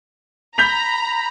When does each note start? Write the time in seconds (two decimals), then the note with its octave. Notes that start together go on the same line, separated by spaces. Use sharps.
0.58 A#5 B5 G6 B6 F7